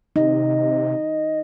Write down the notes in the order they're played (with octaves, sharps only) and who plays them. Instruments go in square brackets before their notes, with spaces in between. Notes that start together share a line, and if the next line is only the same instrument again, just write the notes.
[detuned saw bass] C3 [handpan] D#4 [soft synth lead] D#5